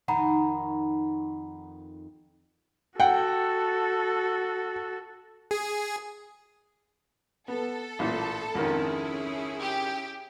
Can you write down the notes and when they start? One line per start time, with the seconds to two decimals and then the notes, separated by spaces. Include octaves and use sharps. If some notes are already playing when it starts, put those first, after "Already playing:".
0.08 F2 D#3 D#4 F#5 A#5 B5
3.00 F#4 A4 F#5 G5
5.51 G#4
7.48 B3 A4
7.99 A1 A#2 E3
8.55 G#1 F2 D#3 C#4 E4 G#4
9.60 G4